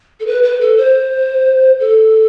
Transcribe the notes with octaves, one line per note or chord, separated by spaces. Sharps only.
A4
B4
B4
A4
C5
A4